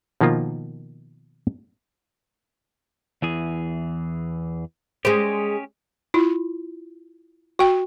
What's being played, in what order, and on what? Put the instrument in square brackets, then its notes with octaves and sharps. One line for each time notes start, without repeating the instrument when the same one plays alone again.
[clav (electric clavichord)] B2 D#3 F3 A#3 F4
[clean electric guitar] E2 E3 G#4
[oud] G#3 C5 [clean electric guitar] C#4 G4
[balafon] E4 F4
F#4 G5